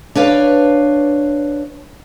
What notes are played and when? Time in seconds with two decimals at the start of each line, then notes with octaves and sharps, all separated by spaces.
0.15 D4 B4 C#5 F5